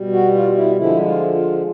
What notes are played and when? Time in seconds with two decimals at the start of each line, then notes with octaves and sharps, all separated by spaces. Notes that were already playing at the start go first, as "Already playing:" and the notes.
Already playing: B2 G3
0.13 F#4
0.34 F4
0.56 E4
0.77 D3 F3 G#3 E4
1.05 F4
1.34 F4